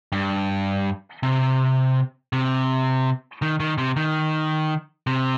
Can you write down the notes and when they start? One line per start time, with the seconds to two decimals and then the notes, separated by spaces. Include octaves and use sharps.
0.12 G2
1.23 C3
2.33 C3
3.42 D#3
3.60 D#3
3.78 C3
3.96 D#3
5.07 C3